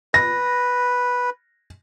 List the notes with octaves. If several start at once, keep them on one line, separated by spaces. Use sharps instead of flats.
B4 A#6